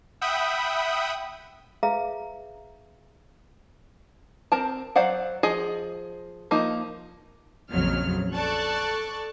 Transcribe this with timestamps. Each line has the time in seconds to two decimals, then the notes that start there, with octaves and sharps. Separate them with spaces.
0.21 E5 F#5 G5 B5 D#6
1.83 G#4 B4 E5 F5 A#5
4.52 C4 A#4 A5
4.96 F#3 C5 D5 F5 F#5
5.43 F3 G#4 D#5
6.51 F3 A#3 D#4
7.71 A#1 F2 C#3 F#3 F6
8.34 A4 D5 A5 C#6 F#6